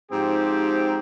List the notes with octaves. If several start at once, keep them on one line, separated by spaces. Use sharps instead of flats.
G#2 F3 C4 G4